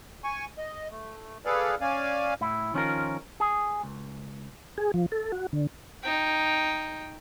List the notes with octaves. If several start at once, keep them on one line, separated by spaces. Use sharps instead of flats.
G#5 C#6
D#5
A3
G#4 A4 B4 D5 F5
C#4 D5 F5 G#5
A2 E4
D#3 F3 C#4 D#4 F4 A#4
G#4
C#2
G#4
F3
A4
F#4
D3
D#4 G5